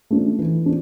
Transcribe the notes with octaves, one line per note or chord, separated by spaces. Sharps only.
A3 D4
E3
D4